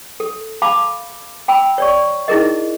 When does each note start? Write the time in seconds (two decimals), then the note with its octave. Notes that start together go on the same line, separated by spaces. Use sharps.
0.20 A4
0.62 F5 A5 B5 D6
1.48 G5 B5 E6
1.78 C#5 D5 C#6
2.28 D#4 E4 G#4 A#4 D#5